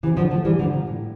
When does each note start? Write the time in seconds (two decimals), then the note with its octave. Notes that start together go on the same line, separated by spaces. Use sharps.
0.03 C3 E3
0.17 D3 F3
0.31 F3 A3
0.45 E3 G3
0.59 D3 F3
0.73 A#2
0.87 A2